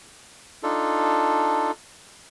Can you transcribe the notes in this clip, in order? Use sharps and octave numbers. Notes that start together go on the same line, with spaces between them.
D4 D#4 F4 A4